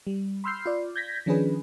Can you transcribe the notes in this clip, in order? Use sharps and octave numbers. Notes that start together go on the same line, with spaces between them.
G3
B5 C6 E6 F6 G6 C7
F4 D5
G6 G#6 A#6 B6
D#3 F3 C#4 D4 G#4 B4